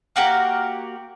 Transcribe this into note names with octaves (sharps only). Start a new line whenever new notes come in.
A#3 F#4 G4 A#4